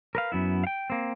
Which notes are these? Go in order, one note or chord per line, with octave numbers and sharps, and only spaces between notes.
A#4 B4 F5
F#2 B3 E4
F5 G5
A#3 C4